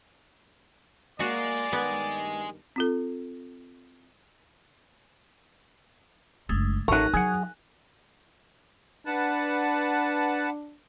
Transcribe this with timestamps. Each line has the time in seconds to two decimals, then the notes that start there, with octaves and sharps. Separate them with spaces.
1.20 G#3 A#3 F#4 D5
1.73 G2 D#3 B3
2.76 C4 F4 A4
6.49 F#1 G#3 A3 D4
6.88 A1 F#3 A3 D#4 A#4 C#6 F#6
7.14 F#3 G#4 F#5 G#5
9.06 D4 B4 F#5 A5